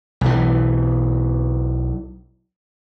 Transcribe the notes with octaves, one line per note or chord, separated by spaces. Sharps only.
B1 E3